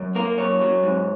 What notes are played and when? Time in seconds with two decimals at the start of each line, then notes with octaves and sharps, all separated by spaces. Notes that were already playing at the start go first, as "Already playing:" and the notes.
Already playing: F#2
0.15 A#3 A#4
0.37 F#2 C#5
0.61 F#3
0.83 G#2